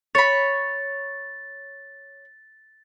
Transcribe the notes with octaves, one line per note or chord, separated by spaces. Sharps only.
C#5 B5 A6